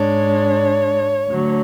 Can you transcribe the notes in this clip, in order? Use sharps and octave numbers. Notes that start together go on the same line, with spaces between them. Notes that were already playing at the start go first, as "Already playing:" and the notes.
Already playing: G#2 G#3 D4 C#5
D2 D3 F#3